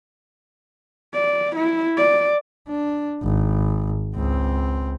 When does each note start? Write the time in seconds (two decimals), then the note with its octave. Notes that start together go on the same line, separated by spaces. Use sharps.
1.14 D5
1.56 E4
1.97 D5
2.69 D4
3.23 G#1
4.15 C#2 C4